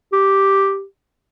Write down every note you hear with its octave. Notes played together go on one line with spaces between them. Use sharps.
G4